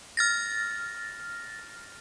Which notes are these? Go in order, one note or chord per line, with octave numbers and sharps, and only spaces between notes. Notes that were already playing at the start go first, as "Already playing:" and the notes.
F6 A6 A#6